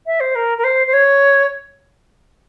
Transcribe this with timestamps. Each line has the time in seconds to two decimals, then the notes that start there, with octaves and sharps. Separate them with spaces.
0.06 E5
0.20 C5
0.35 A#4
0.57 A#4
0.64 C5
0.87 C5
0.93 C#5